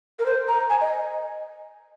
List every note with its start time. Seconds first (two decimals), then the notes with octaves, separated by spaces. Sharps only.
0.19 A#4
0.26 C5
0.48 A#5
0.70 G#5
0.81 D#5